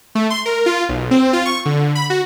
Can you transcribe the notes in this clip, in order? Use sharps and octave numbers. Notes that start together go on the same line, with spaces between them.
A3
C6
A#4
F4
B1
C4
F4
C#6
D3
B5
F#4